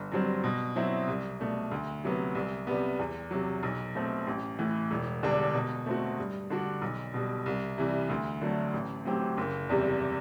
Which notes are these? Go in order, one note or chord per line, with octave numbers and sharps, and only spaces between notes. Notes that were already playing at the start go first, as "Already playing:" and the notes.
Already playing: G1
G2 F#3 C4
B2
F#3 C4 E4
C2
B2 A3 D4
D2
C3 F#3 B3
C2
C3 G3 B3
E2
C3 F#3
B1
B2 A3 C4
A1
A2 E3
E1
E2 D3 G3 D4
B2
A3 C4 F#4
G2
D3 G3 D4 F#4
B1
B2 G3
C2
C3 E3 G3
D2
D3 F#3 A3
A1
A2 F#3 C4 G4
F#1
E2 C3 G3